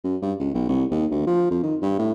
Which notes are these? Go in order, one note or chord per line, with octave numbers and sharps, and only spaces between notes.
F#2
G2
C#2
B1
C2
D#2
D2
F3
F2
D#3
G2
A2